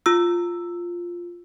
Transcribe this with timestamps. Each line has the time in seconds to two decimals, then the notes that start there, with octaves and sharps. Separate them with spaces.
0.06 F4 E6